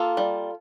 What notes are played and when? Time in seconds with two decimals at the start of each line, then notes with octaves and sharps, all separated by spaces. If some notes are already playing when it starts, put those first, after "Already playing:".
Already playing: A#3 F4 A4
0.17 G3